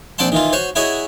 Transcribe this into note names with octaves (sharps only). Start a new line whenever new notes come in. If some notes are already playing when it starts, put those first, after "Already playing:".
A#1 C4 D5 F#5 A5 C6
D#3 E3 F4
F#4 C5 C#5
E4 F#4 G#4 C#5 D#5